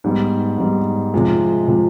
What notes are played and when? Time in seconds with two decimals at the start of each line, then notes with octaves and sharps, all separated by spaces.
0.04 G#2 G3 B3
0.58 G#2 G3 B3
1.14 C3 F3 G#3
1.68 C3 F3 G#3